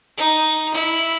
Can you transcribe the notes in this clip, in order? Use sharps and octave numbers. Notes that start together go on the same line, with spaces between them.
D#4
E4